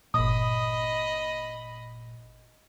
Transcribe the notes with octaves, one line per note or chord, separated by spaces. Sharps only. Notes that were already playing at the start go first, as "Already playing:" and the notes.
G1 A#2 D#5 B5 D#6